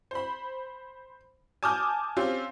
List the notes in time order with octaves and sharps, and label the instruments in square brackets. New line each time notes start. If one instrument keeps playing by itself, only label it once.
[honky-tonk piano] C5 B5
G#5 A5 D6 D#6 F6 G6
C4 C#4 F4 G4